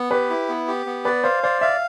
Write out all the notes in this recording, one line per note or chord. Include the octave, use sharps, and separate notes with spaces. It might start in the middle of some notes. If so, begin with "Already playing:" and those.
Already playing: B3
G4 B4
E4
B3
G4
B3
B4 D5
C5 F5
C5 D5
E5 F5